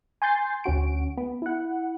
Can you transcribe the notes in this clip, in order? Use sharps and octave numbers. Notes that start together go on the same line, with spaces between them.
G#5 C6 G6 A6 C7
D2 C#4 F#4 D7
B3
E4 F#5